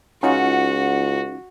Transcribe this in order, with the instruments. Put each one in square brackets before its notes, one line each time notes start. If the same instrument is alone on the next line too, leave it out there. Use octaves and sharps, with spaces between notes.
[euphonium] C#2 [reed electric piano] C#4 D#4 F4 [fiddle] F#4 [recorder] F#5